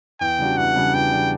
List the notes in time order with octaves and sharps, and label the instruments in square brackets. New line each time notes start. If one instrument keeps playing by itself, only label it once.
[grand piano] E2 [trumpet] G5
[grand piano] C#3 G3 D4 F#4
[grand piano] E2 [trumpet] F#5
[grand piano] C#3 G3 D4 F#4
[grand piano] E2 [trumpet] G5
[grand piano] C#3 G3 D4 F#4